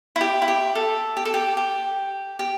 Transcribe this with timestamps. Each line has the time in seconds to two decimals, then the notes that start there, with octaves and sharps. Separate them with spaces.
0.16 E4
0.21 G4
0.42 E4
0.48 G4
0.75 A4
1.17 G4
1.25 A4
1.34 G4
1.57 G4
2.39 G4